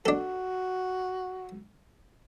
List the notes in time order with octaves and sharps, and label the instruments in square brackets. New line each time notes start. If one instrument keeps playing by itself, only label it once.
[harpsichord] D4 A4 [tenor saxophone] F#4